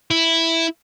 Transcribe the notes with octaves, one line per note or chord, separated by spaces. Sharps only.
E4